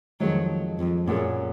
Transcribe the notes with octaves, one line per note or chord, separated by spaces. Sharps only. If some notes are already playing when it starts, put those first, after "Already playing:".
F2 D#3 F3 F#3 G#3
F2
F#2 A#2 F#3 C#4 G#4